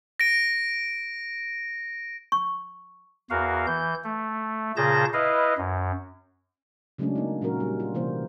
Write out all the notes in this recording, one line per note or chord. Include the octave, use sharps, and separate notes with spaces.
A#6 D7
C#6
E2 F#4 A#4 F5
E3 G6
A3
A#2 C#3 G#4 A5 G6 A#6
E4 B4 D#5 F5
F#2
C#3 F#3 G#3 A3 C#4 D4
A#3 D#4
A#2 F#3 C#4 F#4 A#4
G3
F4
C3 E3 A#3 C5